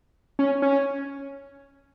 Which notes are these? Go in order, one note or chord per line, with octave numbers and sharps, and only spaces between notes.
C#4
C#4